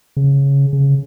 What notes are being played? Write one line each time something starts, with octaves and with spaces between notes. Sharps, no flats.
C#3
C#3